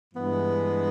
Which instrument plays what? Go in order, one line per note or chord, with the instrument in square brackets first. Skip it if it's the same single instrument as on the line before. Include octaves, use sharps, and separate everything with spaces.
[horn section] G2 E3 G#3 B3